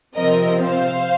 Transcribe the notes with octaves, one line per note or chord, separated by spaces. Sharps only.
C3 F3 C4 A#4 D#5
C5 F5